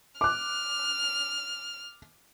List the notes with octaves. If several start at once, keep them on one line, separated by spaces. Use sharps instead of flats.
D6 F6 F#6